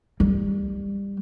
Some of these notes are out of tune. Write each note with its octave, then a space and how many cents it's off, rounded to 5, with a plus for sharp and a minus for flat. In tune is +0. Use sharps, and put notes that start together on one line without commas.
G3 +25